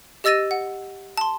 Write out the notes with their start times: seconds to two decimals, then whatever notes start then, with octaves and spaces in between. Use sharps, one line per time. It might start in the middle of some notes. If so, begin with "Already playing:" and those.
0.24 G4 D#5 E6 A6 A#6 D#7
0.51 F#5
1.17 A5 C6